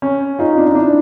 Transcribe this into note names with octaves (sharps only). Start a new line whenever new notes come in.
C#4
D#4 F4
D4
D#4
D4 E4